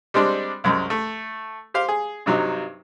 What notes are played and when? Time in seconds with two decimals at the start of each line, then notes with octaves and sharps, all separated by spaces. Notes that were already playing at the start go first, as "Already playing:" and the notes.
0.14 G3 G#3 C4 D4
0.64 C2 F#2 G#3
0.90 A3
1.74 G4 C5 F5
1.89 G#4
2.26 G2 C3 F#3 D#4